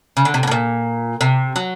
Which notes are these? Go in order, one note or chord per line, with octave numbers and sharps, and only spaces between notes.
C#3
D3
C3
B2
A2
A#2
C3
F#3